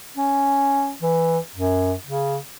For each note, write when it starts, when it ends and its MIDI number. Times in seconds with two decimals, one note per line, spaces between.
0.17 0.93 61
1.02 1.38 52
1.55 1.94 42
2.07 2.37 49